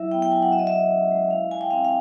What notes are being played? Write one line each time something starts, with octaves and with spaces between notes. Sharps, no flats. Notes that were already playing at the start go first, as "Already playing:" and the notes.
Already playing: F#3 E4 E5
B3 G5
G5
F#3 G#5
F#5
F#4 E5
D#5
G#3 E5
C#4
G#3
E4 F5
G#3 G#5
G5
C4 F5
F5